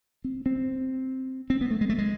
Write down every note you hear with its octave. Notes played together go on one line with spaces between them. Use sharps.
C4
C4
C4
B3
A3
G#3
A3
G#3